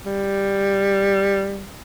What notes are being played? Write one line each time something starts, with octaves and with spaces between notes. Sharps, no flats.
G3